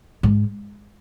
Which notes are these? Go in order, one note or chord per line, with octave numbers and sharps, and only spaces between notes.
G#2